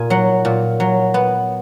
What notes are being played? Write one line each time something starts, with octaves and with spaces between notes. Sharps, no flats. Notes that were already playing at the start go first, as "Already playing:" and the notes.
Already playing: A#2 G#5
F#3 F#5
A#2
F#3
B3